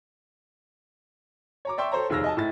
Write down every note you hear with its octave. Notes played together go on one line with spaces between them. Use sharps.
C#5 A#5 D6
D5 E5 G5 C6 C#6 E6
A4 C5 C#5 A#5
F1 D#2 G#4 E6 F6 A#6
D#5 G#5 A5
A2 E4 A6